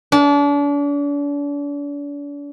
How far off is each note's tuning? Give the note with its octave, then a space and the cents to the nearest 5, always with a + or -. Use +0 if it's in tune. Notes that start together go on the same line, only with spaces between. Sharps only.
D4 -40